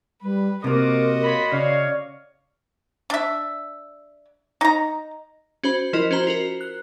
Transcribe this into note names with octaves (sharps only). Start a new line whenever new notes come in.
G3 B4
C3 A#3 F4 F#4 A#4 D#5 D6
F4 C#5 B5
C#3 C#5 D5 F5
D4 E5
D#4 A#5
C#4 F#4 C5 B5
F3 E4 F4 A#4 D#5
C#4 F#4 C5 A#5
F4 F#4 A#4
F#6